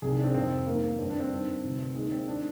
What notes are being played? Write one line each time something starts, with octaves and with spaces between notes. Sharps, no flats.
C2 C3 D#3 G#4
G#4
D4
C4
F2 C3 D#3 C4
G2 D#3 A#3
A#3
G2 D3 C4
D4
C4
G2 D#3
D2 C3 D#3
D#2 D#3 G#3
C4
D#3 D4